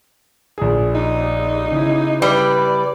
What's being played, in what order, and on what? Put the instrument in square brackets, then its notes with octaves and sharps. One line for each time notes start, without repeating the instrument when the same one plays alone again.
[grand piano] A#1 G#4
[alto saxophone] D#4
[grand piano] C#3 E4
[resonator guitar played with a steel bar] G3 [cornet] B4 [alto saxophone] D5